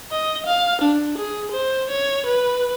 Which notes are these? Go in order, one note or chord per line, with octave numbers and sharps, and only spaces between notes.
D#5
F5
D4
G#4
C5
C#5
B4